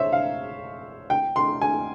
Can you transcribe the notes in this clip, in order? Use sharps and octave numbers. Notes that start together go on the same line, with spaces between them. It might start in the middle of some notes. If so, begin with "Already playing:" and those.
Already playing: C5 C#5 E5
F5
G5
C6
G#5